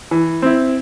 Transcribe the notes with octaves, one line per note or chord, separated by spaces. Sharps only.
E3
C4 E4